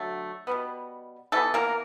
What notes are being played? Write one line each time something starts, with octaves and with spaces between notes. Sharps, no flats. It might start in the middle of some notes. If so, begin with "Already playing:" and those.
Already playing: D3 F#3 A3
B2 G3 B3
E3 G3 A3 B3 A4
A#3 A#4